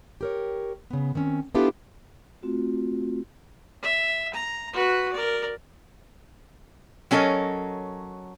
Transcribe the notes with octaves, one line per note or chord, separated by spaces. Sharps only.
G4 A#4 C#5
C#3 B3
D#3 C4 C#4
B3 D4 E4 F4 G4 A4
A3 C4 F4 F#4
E5
A#5
F#4 B4
A#4 D5
F#3 C#4 A4 A#4 D#5